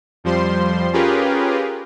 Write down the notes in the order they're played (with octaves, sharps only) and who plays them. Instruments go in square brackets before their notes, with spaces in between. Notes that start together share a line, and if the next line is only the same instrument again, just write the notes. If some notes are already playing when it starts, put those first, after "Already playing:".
[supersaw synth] F2 F3 G3 C5 C6
C#4 F4 G4 G#4 A#4 B4